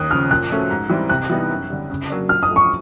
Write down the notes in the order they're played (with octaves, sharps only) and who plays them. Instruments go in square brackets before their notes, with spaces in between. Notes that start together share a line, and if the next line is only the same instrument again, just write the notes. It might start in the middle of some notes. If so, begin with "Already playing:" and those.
Already playing: [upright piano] D#2 [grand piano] D#6 F#6
[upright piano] C#3 F3 [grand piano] F6
[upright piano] A#2 [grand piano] F#6
[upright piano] F3 A3 C#4 F#4
G#2
E3 G3 C4
[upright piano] C3 [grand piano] F#6
[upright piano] E3 G3 B3 D#4
F#2
D3 G3
C#3
F#3 A#3 D4
[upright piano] A#2 [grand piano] F6
[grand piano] D#6
[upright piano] F3 A3
[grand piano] C#6